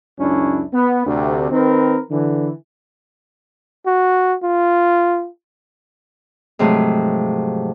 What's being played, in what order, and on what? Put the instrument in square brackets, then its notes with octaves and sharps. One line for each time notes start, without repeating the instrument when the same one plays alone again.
[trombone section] C#2 F#2 C#4 D4 E4
B3
D2 C3
D#3 C4 A#4 B4
D3 E3
[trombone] F#4
F4
[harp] G#2 C3 F3 F#3 A3